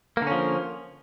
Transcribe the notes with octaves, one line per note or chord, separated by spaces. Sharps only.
D3 F3 A#3 C#4